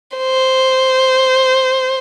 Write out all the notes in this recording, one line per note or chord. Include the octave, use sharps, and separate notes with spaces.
C5